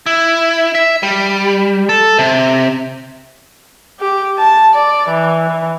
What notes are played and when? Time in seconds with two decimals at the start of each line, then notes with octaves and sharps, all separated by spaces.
0.06 E4
0.75 E5
1.03 G3
1.89 A4
2.19 C3
4.00 G4
4.39 A5
4.74 D5
5.09 E3